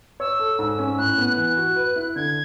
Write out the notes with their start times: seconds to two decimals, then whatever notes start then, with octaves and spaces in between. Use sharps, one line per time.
0.20 C#5 E6
0.40 A4
0.59 G#2
0.79 C#4
0.98 A2 F#6
1.18 B3
1.37 E3 F#6
1.57 F#4
1.76 B4
1.96 E4
2.15 D3 G#6